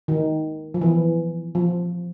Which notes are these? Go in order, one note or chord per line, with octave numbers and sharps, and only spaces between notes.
D#3
F3
E3
F3